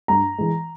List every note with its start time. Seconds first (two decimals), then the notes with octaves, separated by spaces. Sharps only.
0.08 G2 A#5
0.38 E3 G#3